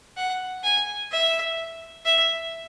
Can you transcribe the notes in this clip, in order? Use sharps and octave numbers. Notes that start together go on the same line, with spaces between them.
F#5
G#5
E5
E5